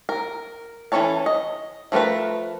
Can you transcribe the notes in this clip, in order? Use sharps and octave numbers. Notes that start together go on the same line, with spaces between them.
A#4
E3 C#4 A4 C#5 A5
D#5
F3 A3 F#4 A#4 B4